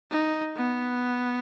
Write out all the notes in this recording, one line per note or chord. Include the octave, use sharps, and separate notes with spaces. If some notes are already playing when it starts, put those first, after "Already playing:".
D#4
B3